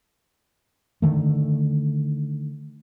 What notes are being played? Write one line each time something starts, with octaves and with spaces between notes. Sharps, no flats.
D3 D#3 A3